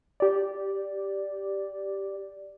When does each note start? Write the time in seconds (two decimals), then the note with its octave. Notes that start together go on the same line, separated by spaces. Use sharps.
0.20 G4 D5